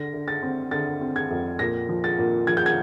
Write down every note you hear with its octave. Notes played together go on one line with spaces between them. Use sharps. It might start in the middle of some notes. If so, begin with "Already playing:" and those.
Already playing: D3 A#6
D3
A6
C4
D3 A6
C4
G#6
F2
A#2 A#6
F3
A6
A#2
F3 G#6
G6
G#6